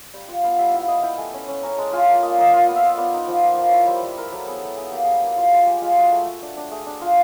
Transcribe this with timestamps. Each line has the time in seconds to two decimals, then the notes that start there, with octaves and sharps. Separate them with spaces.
0.14 G3 G5
0.28 F4 F#5
0.44 B3 F5
0.58 G3 E5
0.73 E4 F5
0.88 E4 D#5
1.03 E4 G5
1.18 A3 G#5
1.34 C#4
1.48 C#4
1.63 C#4 A#5
1.78 G#3 A5
1.93 F4 G#5
2.08 A#3 A5
2.23 A#3 D#5
2.32 D5
2.38 A#3 D#5
2.53 F4
2.59 F#5
2.67 B3 F5
2.76 E5
2.83 F4 D#5
2.98 B3 D5
3.13 D#4
3.28 F3
3.43 A#3
3.58 F3
3.68 E4 C5 C#5
3.87 G3 C5
4.02 G3 C5
4.18 E4 A#4
4.32 F#3 A4
4.47 B3 G#4
4.62 F#3 A4
4.76 B3 G#4
4.91 A#3 G4
5.04 G3 G#4
5.22 A#3 F#4
5.37 G3 F4
5.52 G#3 F#4
5.67 G#3 G4
5.82 G#3 F4
5.97 G#3 F#4
6.12 A3
6.26 A3
6.42 D4
6.57 D4
6.71 A3 G#4
6.87 D4
7.01 F4